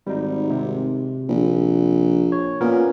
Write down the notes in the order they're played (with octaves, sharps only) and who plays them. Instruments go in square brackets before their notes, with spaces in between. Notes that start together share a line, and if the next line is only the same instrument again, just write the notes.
[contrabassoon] G#1 [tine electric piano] G3 D#4
[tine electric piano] C3
[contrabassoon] A#1
[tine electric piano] C#5
[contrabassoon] A#2 [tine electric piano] B3 C#4 A#4